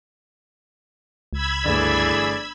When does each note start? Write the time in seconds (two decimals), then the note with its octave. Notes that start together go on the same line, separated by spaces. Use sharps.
1.33 C#2 B5 E6 G#6
1.65 G1 E3 A3 G#4 D5